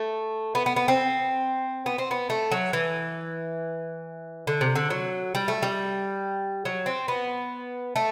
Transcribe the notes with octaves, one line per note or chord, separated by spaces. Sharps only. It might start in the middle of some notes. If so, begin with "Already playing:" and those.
Already playing: A3
B3
B3
B3
C4
B3
C4
B3
A3
F#3
E3
D3
C3
D3
F#3
G3
A3
G3
F#3
C4
B3
A3